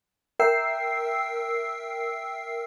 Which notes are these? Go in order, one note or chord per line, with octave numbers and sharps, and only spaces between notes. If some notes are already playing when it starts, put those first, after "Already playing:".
A#4 E5 G5 E6 C7